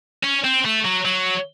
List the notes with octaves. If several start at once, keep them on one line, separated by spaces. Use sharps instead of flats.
C#4
C4
A3
F#3
F#3